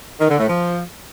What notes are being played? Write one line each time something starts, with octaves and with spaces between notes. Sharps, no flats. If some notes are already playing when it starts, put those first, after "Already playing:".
D#3
D3
A2
F3